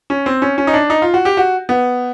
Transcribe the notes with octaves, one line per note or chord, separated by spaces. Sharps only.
C#4
C4
C#4
C#4
D#4
D4
D#4
F4
F#4
G4
F#4
B3